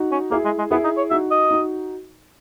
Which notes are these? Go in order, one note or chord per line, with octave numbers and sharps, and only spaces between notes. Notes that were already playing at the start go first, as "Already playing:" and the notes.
Already playing: D#4 F#4
C#4
A#3 E4 G#4
G#3
G#3
B3 E4 G#4
D#4
C#5
D#4 F#4 E5
D#5
D#4 F#4